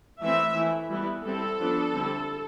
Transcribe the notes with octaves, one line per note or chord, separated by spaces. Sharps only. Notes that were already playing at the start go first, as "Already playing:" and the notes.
E3 A3 C4 E4 E5
E3 A3 E4
E3 G3 B3 E4
G3 C4 E4 A4
F3 B3 D4
D3 G3 C4 E4